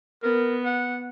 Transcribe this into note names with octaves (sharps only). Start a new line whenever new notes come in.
B3 A#4
F#5